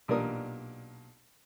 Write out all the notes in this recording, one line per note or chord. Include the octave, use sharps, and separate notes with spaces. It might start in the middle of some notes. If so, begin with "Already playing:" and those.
B1 A#2 G3 D4 A#4 D#6